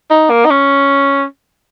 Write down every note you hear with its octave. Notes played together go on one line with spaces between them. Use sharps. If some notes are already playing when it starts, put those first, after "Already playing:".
D#4
A#3
D#4
C#4